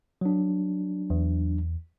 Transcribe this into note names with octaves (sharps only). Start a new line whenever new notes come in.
F#3 D4
E2